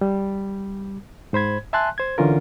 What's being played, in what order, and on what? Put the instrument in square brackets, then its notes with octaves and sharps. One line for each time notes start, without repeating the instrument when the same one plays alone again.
[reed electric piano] G3
G#2 C5 B5 G#6
E5 G#5 A5 C6 F#6
C5 G#6
D3 E3 C#4 F4 A#4